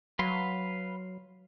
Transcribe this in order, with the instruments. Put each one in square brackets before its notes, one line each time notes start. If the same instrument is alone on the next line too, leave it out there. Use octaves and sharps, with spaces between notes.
[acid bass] F#3 [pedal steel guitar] B4 F5 C6